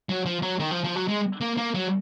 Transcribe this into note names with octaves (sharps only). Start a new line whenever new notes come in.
F#3
F3
F#3
D#3
F3
F3
F#3
G#3
A#3
A#3
F#3